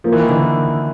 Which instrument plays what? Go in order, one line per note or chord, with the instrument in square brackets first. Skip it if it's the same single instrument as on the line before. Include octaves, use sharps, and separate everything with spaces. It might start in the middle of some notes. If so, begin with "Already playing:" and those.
[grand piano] F3 [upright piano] A#3
[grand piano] E3
D#3
D3 E3